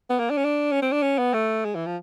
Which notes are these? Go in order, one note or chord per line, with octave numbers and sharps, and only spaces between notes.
B3
A#3
D4
C#4
D4
C#4
C4
D4
C#4
B3
A3
G#3
E3
F3